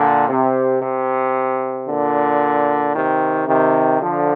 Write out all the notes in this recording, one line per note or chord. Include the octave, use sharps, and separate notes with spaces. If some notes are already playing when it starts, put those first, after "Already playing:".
Already playing: A#2 D3
C3
C3
A#2 D3
C3 D#3
C3 D#3
D3 F3